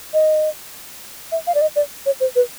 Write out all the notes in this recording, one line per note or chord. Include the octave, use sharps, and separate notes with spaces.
D#5
E5
F5
D5
D#5
D5
C#5
C5
B4